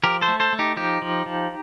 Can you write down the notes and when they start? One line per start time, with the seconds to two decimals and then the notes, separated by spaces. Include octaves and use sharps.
0.04 F3 G4 A#4
0.21 A4 C5
0.28 A3
0.40 A4 C5
0.53 A3
0.59 D#4 G4
0.77 F3 D#4 G4
1.02 F3
1.26 F3